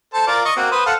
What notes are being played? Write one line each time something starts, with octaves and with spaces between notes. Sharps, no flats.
A4 C5 A5
F4 A#4 D5
D#5 C#6 D#6
A#3 C4 F#4
B4 C5 D#6
A4 F5 F#5